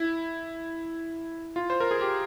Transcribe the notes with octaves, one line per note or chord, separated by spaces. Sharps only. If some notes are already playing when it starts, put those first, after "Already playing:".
Already playing: E4
F4
C5
A#4
G#4
G4